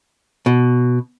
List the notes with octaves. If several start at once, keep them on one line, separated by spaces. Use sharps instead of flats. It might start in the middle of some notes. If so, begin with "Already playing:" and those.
B2